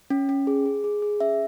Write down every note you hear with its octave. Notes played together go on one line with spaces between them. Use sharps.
C#4
C#4
G#4
G#4
G#4
G#4
C#4 E5